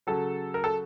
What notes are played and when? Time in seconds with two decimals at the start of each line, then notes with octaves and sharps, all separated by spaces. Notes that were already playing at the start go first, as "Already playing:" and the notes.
0.07 C#3 F#3 A4
0.54 A#4
0.64 A4